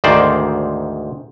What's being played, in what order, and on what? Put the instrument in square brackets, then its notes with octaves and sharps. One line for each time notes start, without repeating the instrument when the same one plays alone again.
[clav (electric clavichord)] D2 G#2 D#3 C5 D5